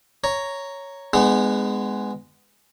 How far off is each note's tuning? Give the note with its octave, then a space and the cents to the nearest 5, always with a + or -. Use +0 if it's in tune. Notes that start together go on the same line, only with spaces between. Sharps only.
C#5 +0 A#5 +0
G#3 +0 B3 +20 D#4 -40